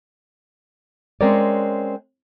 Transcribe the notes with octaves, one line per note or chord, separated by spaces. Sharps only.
G#3 C4 C#4 A#4 C#5 D5